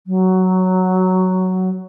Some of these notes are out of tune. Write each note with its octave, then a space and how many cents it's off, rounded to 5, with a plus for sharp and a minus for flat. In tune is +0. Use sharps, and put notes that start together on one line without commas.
F#3 +5